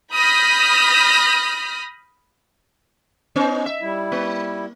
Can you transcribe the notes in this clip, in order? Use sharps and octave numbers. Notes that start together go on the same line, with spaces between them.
B5 D#6 F6 G6 A#6 B6
B3 C#4 D#4
E5
G3 E4
A#3